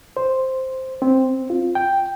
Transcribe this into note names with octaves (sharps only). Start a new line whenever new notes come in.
C5
C4
F4
G5